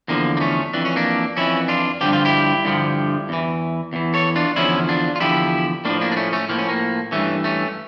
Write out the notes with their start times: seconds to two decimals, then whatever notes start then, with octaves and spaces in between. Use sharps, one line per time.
0.08 E2 D3 F3 A#3
0.37 A#3
0.40 A3 C#4
0.73 F2 E3 D4
0.85 C#4
0.96 A#3 D4
1.37 F2 E3 C#4 E4
1.68 D4 F4
2.01 G2 D3 F3 G4
2.13 F4
2.25 E4 G4
2.65 G2 D3 F3
3.29 E2 E3
3.93 E2 E3
4.14 A4 C#5
4.36 D4 F4
4.56 E2 D3 F3 C#4 E4
4.89 D4 F4
5.16 F4
5.20 E2 D3 F3 E4 G4
5.85 A2 F3 A#3 D4
6.01 A#3 D4
6.12 D4
6.17 A3 C#4
6.33 A3 C#4
6.49 A2 F3 A#3
6.59 C#4
6.69 A#3
7.12 G2 E3 A3 C#4
7.44 A3 C#4